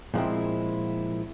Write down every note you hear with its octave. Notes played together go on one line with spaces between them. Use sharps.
A#2 F3 G#3 C4 E4